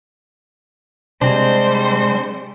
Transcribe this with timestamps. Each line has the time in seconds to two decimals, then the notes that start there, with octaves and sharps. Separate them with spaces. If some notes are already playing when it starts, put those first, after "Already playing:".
1.22 C3 G3 G#3 C4 D4 C5